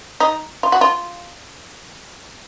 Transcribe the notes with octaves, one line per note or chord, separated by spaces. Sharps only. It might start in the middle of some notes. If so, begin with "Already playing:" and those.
D#4
F4
F#4
F4